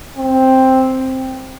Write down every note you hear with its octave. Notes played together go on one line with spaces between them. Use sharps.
C4